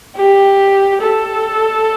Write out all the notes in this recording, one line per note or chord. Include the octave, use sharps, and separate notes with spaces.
G4
A4